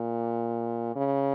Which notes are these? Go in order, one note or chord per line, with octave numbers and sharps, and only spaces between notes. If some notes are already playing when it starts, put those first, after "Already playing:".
Already playing: A#2
C#3